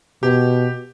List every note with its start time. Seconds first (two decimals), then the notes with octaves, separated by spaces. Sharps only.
0.23 B2 G4